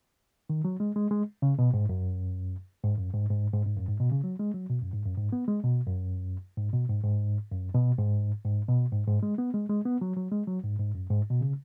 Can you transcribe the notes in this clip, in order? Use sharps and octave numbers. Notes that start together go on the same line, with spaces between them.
D#3
F#3
G#3
G#3
G#3
C#3
B2
G#2
F#2
G#2
F#2
G#2
G#2
G#2
G#2
F#2
G#2
B2
C#3
F#3
G#3
F#3
B2
F#2
G#2
F#2
G#2
B3
G#3
B2
F#2
G#2
B2
G#2
G#2
F#2
B2
G#2
G#2
B2
G#2
G#2
G#3
B3
G#3
G#3
B3
F#3
F#3
G#3
F#3
G#2
G#2
F#2
G#2
B2
C#3